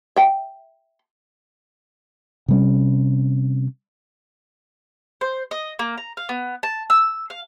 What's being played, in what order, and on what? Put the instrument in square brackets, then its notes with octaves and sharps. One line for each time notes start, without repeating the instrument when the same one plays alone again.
[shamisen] E5 G5
[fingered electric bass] C3 G3 C#4
[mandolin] C5
D#5
A#3
A#5
F5
B3
A5
E6
F5